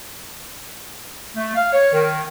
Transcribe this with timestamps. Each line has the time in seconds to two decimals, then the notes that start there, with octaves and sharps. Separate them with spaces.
1.36 A3
1.54 F5
1.72 C#5
1.92 D#3